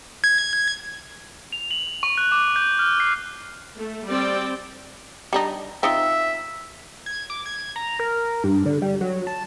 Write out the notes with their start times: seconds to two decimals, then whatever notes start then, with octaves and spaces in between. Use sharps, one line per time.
0.24 G#6
1.52 F7
1.71 F#7
2.03 C#6
2.18 F#6
2.32 D6
2.56 G6
2.79 F6
3.00 C7
3.78 A3
4.09 G3 C4 D5 G5
5.33 G3 D4 D#4
5.83 C4 D#4 F4 E5
7.06 G#6
7.30 D6
7.46 G#6
7.76 A#5
7.99 A#4
8.44 G2
8.66 D3
8.82 G3
9.01 F#3
9.27 A5